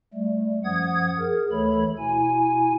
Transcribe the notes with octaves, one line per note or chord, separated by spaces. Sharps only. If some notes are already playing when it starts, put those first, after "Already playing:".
G3 A3
F#2 F3 F#5 D#6 G#6
G#4 A#4
D2 E3 A3 A4 C#5 B5
B2 E4 G#5